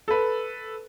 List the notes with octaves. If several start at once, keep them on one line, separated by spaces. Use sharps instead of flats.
A4 B4